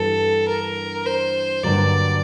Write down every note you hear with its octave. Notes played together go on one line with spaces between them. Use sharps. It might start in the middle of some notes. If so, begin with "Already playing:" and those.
Already playing: G2 E3 G3 B3 D4 A4
A#4
C5
G2 D3 F#3 A#3 D5